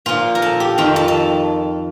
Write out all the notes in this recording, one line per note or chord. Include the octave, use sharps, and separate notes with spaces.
A#2 F3 F4
A#4
A4
G4
F2 D#3 F4
A4
A4